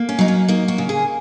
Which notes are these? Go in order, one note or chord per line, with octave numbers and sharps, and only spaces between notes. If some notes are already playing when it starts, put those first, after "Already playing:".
Already playing: A#3
C#4
F#3 D#4
C#4
A#3 D#4
F#4
C#3
G#4